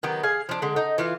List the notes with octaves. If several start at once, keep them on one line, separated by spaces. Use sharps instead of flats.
D#3 F#3 B3 G4
G#4 F5 G#5
F3 D4
D3 G#3
D#4
E3 F4 F5